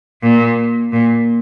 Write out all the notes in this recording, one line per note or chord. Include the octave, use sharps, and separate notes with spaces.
A#2
A#2